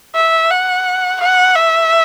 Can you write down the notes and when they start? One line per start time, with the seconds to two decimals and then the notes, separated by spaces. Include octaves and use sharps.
0.15 E5
0.50 F#5
1.20 F#5
1.55 E5